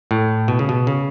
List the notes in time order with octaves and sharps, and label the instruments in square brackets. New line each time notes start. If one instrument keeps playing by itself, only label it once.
[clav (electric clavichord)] A2
B2
C#3
B2
C#3